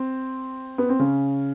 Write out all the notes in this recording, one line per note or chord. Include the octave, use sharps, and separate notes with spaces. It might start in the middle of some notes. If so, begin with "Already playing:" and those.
Already playing: C4
B3
C4
C#3 C#4